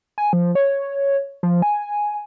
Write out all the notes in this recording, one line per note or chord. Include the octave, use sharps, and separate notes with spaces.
G#5
F3
C#5
F3
G#5